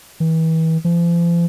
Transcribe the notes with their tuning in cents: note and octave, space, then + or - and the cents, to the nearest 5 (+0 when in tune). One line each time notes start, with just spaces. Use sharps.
E3 -35
F3 -40